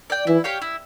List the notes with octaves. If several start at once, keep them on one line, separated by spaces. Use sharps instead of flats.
D5 G5
E3 E4
G4 C#5 F5
E4